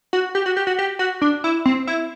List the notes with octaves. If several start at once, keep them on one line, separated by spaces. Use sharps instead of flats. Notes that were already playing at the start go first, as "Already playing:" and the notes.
F#4
G4
F#4
G4
F#4
G4
F#4
D4
E4
C4
E4